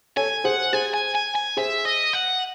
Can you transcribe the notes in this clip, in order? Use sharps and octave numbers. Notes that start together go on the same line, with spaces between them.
A4 C#5 G#5
G#4 C5 F#5
G#4 C5 G#5
G#5
G#5
G#5
G#4 C5 E5
D#5
F#5